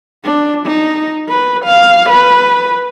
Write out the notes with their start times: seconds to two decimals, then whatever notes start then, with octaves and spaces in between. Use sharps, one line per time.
0.24 D4
0.66 D#4
1.29 B4
1.65 F5
2.10 B4